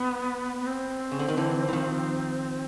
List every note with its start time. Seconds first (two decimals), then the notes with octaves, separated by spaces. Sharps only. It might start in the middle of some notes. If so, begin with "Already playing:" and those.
Already playing: B3
0.61 B3
0.67 C4
1.12 C#3
1.19 D3
1.28 D#3
1.37 D3 E3
1.68 E3
1.73 D#3 F3